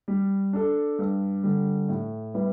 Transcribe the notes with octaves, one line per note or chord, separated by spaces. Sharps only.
G3
D4 A4
G2
D3 G3
A2
G3 B3 E4